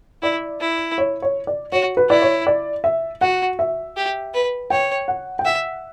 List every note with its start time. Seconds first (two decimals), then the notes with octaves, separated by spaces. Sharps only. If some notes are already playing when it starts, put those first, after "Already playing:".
0.23 E4 D5
0.60 E4
0.98 C#5
1.22 C#5
1.47 D5
1.72 F#4 C#5
1.97 B4
2.09 E4 D5
2.22 C#5
2.47 D5
2.84 E5
3.21 F#4 F#5
3.59 E5
3.96 G4
4.34 B4
4.70 C#5 G5
5.08 F#5
5.39 G5
5.45 E5 F#5